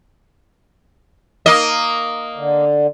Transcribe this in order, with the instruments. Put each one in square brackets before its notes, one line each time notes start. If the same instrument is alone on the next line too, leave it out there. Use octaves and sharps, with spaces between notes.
[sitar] A#3 D#5
[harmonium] D3